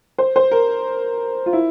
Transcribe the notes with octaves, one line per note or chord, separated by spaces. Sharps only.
C5
C5
A#4
F4
E4